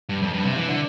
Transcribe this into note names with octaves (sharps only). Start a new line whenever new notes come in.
G2
F2
G2
C3
E3
D3